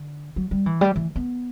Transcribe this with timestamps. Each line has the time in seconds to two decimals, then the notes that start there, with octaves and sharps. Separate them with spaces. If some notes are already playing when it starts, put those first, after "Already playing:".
Already playing: D3
0.36 F#3
0.51 G3
0.66 E3
0.81 G3
0.96 E3
1.16 B3